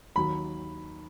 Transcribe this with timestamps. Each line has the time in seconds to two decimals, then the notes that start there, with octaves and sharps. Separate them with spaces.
0.16 D#2 D#3 F#3 B5